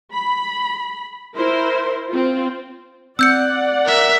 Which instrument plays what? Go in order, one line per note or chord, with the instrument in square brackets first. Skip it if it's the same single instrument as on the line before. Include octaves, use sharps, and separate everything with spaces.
[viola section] B5
E4 A#4 C5
C4 F4
[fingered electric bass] C4 [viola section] D5 F#5 [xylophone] E6 G6 C#7
[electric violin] A#4 E5